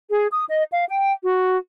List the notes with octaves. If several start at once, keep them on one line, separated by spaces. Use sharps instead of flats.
G#4
D#6
D#5
F5
G5
F#4